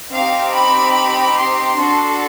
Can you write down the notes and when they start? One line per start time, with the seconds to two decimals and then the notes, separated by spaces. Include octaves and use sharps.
0.11 C4 D#4 G4 F5
0.53 B5
1.37 C6
1.78 D4 F#4 A4